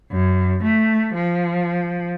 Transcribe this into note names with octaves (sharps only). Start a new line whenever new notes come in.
F#2
A3
F3